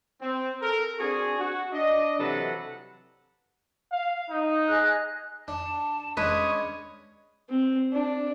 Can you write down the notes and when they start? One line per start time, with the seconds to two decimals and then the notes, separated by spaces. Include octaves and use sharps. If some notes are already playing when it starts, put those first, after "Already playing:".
0.21 C4
0.62 A4 A#4
1.00 C4 D4 F#4 G#4
1.39 F#4
1.72 D4 D#5
2.19 C3 E3 F#3 A4 B4 F#5
3.92 F5
4.30 D#4
4.67 G#4 D#5 F#6
5.48 D4 A5
6.17 G#3 C#4 D4 B4 D#6 G#6
7.49 C4
7.92 D4